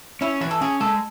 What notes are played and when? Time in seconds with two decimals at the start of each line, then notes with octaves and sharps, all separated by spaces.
0.21 C#4 E4
0.41 E3 F#4
0.51 A4
0.61 C#4 G#4
0.80 G#3 A4